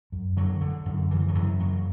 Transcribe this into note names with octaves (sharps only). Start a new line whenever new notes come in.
F#2
D3 F#3
D3
F#2
C#3 E3
F#3
F#2 E3
C#3 F#3